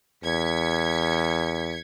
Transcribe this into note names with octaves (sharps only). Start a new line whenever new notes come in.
E2 G#6 B6 C#7